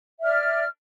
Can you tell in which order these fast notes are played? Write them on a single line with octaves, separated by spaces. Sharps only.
E5 D5 F6